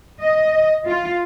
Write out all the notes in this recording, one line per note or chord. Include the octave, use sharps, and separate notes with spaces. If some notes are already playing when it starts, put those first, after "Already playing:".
D#5
F4